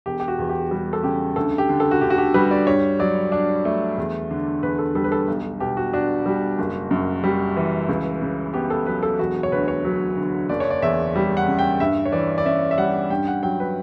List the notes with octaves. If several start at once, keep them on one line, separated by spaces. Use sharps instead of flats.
E1 G4
G4
F#4
E2
G4
G3
A4
C#3 G4
D2 A4
G4
D3
A4
F#4
D2 G4
F#4
G4
G3 B4
D5
G2 C#5
F#3 D5
D4
A3
E2
D3
E2 B4
A4
G3 A4
B4
A4
B1
B2 G4
F#4
D4 F#4
G3
F#1
F#2
G3
E3
C#2
C#3
B3 G4
A4
F#3 B4
A4
E1 F#4
C#5
D2 B4
C#5
F#3
D3
F#1 D5
C#5
D5
E2 E5
G3
F#5
C#3
G5
G2 E5
C#5
E3 D5
D5
C#4 E5
E5
G3 F#5
G2 G5
F#5
F#3 G5
B4